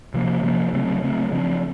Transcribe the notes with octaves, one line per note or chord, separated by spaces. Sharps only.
C3 F3 A#3
C3 F3 A#3
C#3 F#3 A3 C4
C#3 F#3 A3 C4
C#3 F3 C4